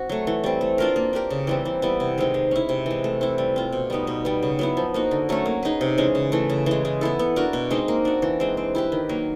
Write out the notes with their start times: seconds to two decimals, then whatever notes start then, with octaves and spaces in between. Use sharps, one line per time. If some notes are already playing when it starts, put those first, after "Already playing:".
Already playing: C4 F#4
0.09 F#3 A3
0.27 E3
0.44 G3 C4
0.61 A3
0.78 D4 F4 A#4
0.96 A#3
1.13 D4 G4 A#4
1.30 C#3
1.47 E3 G3 C4
1.65 E3
1.82 G3 B3 E4
2.00 C3
2.18 D#3 G#3 C4
2.34 G#3
2.51 C#4 E4
2.69 C3
2.86 E3 G#3
3.04 A3
3.21 C4 E4
3.38 G3
3.56 C4 F4
3.72 B2
3.90 G3 B3 D#4
4.07 B2
4.25 G3 B3
4.43 C#3
4.59 F#3 B3 E4
4.77 F3
4.94 A#3 D#4 F#4
5.11 D3
5.29 F#3 A3 C#4
5.46 A#3
5.63 D#4 G#4 B4
5.81 C3
5.98 E3 G#3 C#4
6.15 C#3
6.32 E3 A3
6.50 C#3
6.66 E3 G#3
6.85 G#3
7.01 B3 E4 A4
7.19 B3
7.36 D4 F#4 A#4
7.53 B2
7.71 G#3 C4 D#4
7.88 A#3
8.05 D4 F#4
8.22 E3
8.40 G#3 C4
8.57 C4
8.75 E4 G4 B4
8.92 D#3
9.09 F#3 A#3